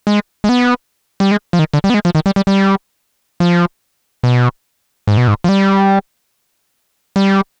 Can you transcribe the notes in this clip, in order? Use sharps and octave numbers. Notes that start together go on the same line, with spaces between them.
G#3
G#3
B3
G3
G#3
F3
D#3
D3
G3
B3
G#3
F3
D#3
G3
G3
G3
F3
B2
G#2
B2
G#2
F3
G3
G3